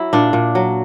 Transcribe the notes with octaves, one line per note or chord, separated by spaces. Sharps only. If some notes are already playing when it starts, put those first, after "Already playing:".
Already playing: F#3 E4
A#2 D4
A#2
F#3